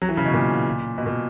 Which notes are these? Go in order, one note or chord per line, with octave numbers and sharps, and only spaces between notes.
F#3
E3
C#3
B2
A#2
B2
A#2